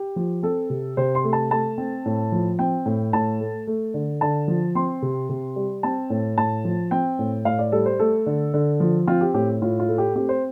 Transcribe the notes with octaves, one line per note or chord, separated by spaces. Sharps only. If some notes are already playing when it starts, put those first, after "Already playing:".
Already playing: G4
F3
C4 A4
C3
C3 C5
C6
A3
A5
A3 A5
C4
A2
F3
C4 G5
A2
A2 A5
A3
A3
D3
D3 A5
F3
C4 C6
C3
C3
G3
C4 A5
A2
A2 A5
F3
C4 G5
A2
A2 F5
D5
G3 A4
C5
A3 A4
D3
D3
F3
C4 F4
G4
A2 G4
A2 F4
F4
A3
G4
C4 G4
C5